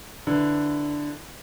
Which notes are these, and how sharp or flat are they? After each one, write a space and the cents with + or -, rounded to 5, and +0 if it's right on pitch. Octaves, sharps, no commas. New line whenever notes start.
D3 +0 E4 +0 B4 +0